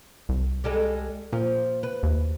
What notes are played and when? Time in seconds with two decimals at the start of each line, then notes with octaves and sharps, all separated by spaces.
0.29 C2
0.64 G3 G#3 A4
1.33 A#2 F3
1.83 B4
2.03 D#2